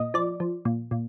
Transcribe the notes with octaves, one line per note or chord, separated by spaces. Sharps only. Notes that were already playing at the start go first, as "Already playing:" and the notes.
Already playing: A#2 D#5
F3 D5
F3
A#2
A#2